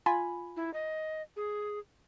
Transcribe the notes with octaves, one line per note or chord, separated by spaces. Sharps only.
F4 G#5 B5
E4
D#5
G#4